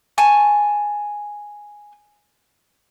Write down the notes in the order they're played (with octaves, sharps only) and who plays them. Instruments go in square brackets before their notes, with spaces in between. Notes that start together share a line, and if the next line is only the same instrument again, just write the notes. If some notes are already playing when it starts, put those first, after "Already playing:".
[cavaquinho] G#5 A5 C#6